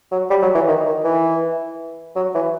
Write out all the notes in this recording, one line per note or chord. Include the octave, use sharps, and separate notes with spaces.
F#3
G3
F#3
E3
D#3
D#3
E3
F#3
E3